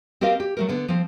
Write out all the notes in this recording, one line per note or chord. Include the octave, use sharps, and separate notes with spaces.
C4 G4 A#4 D#5 F5
G4
F#3 A3 A#4
D3 B3
F3 C4